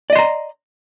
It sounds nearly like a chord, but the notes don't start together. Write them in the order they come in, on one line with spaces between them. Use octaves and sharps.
D5 D#5 C6 A#5